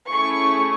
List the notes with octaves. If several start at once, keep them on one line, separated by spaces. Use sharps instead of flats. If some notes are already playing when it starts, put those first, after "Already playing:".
A3 C#4 E4 G#4 C#6